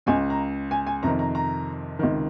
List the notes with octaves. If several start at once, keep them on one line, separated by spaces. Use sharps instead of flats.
C#2 C#3 G#5
A#5
G#5
G#5
F2 C3 D#3 A#5
A#5
A#5
C#2 C3 D#3